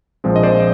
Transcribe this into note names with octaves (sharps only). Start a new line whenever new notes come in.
A#1 A#2 F3 G#3 C4
D#5
C5 D5